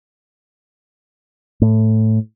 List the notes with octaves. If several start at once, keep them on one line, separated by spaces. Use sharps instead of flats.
A2